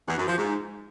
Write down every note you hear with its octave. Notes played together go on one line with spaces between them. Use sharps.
E2
F#2
F3
G#2